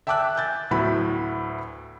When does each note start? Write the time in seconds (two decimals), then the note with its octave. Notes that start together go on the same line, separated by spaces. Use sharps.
0.07 E5 G5 A5 D6 E6 F#6
0.36 G#5 G6 A6
0.71 D2 A2 F#3 B3 E4 B5